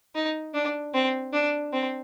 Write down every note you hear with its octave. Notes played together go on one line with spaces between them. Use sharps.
D#4
D4
C4
D4
C4